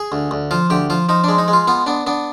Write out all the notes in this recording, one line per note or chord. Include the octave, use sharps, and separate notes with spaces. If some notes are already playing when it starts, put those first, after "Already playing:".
Already playing: G#4
D2
D2
F3 F4
D2 G4
F3 F4
F3 D#4
G#3 D4
D#4
G#3
F4
B3 F4
B3 D4
B3 D4